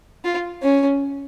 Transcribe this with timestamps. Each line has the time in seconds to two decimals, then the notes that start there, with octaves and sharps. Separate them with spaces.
0.24 F4
0.62 C#4